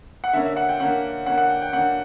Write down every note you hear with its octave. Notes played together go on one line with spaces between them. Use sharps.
F#5
D3 A#3 C#4 E5
E5
F#5
G5
D3 A#3 C#4 F#5
D3 A#3 C#4 F#5
F#5
G5
G5
D3 A#3 C#4 F#5